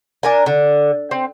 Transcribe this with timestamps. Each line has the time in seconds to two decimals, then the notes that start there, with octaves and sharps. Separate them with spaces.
0.23 D4 A#4 G#5
0.46 D3
1.11 C4